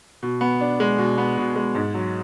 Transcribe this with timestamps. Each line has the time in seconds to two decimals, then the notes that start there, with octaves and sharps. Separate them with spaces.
0.23 B2
0.41 B3
0.61 D4
0.80 G#3
0.98 B2
1.18 B3
1.38 B2
1.56 G#3
1.75 G#2
1.94 F#3